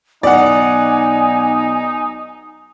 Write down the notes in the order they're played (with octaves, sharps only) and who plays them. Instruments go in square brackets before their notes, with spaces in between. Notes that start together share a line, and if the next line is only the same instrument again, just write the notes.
[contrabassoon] B1 [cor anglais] D#4 [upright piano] D5 F#5 [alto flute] G#5